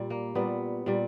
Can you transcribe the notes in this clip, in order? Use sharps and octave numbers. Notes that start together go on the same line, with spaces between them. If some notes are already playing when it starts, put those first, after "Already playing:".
Already playing: A#2 G3
A#3
A#2 G3 B3
A#2 G3